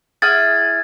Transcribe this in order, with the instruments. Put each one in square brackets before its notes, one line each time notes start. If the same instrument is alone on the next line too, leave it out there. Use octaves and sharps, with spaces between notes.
[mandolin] E4 G#4 F#5 [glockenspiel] F6 G#6 A6